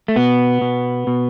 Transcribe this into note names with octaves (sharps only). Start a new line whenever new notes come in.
A3
B2 B3
B2
B2